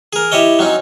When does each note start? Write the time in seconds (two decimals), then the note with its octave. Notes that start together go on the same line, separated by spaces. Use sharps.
0.13 G#4 A#4
0.32 E4 G4 C#5 D#5
0.59 F#3 C4 C#4 D#4